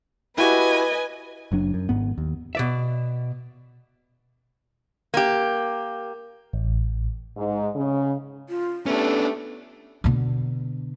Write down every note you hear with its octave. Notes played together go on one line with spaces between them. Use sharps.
E4 F#4 G4 B4 D#5 G#5
F#1 F#3 D4
F#2
G#1 G#2 B3
D#2
B2 D5 E5
A#3 G4
A1
G#2
C#3
F4
A3 B3 C#4 D4 G4 A4
B2 D3